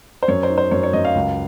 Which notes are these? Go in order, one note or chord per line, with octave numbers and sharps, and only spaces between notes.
C5
F#2 C#5
C5
D#4
C5
F#2 C#5
C#5
F#2 D#5
F5
C#2